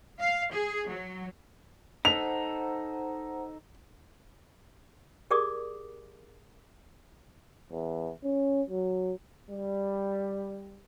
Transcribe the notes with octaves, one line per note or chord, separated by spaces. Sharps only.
F5
G#4
F#3
D#4 A4 C5 F#5 A#5 F7
G4 G#4 A#4 D5 D6 D#6
E2
C#4
F#3
G3